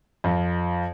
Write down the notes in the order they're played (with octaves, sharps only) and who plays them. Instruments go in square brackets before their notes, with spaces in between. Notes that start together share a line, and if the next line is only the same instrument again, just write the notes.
[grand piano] F2